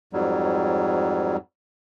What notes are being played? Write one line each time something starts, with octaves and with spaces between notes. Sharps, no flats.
F2 G#2 F#3 G3